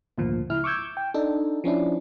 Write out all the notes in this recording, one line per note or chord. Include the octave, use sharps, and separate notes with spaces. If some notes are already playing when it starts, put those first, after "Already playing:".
G#1 D2 A#2 F3
C#2 E4 F6
C#6 D6 E6 G6 G#6
G5
D4 D#4 A4
F3 C#4 D4 E4